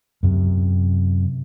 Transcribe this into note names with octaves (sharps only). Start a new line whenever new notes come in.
F#2 C3